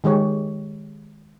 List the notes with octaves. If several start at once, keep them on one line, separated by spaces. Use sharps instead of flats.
D#3 G#3 G4 C#5